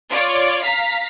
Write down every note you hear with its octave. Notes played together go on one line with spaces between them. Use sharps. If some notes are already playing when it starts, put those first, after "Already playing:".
F4 C#5 D5
F5 A#5 B6